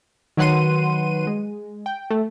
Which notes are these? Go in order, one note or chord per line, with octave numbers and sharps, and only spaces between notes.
D#3 F#3 B4 F#5 C6 D#7
G#3
G5
A3